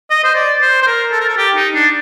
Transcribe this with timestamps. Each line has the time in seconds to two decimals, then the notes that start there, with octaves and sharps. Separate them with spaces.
0.10 D#5
0.24 C5
0.35 D5
0.61 C5
0.82 C5
0.87 A#4
1.12 A4
1.21 A#4
1.29 A4
1.37 G4
1.56 D#4
1.75 D4